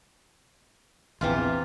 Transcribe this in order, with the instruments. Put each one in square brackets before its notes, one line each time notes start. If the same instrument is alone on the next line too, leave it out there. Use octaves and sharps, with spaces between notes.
[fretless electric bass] A#1 E2 [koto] C3 E3 F4